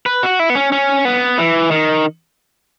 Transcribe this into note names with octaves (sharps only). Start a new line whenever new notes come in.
B4
F#4
E4
B3
C#4
C#4
B3
E3
D#3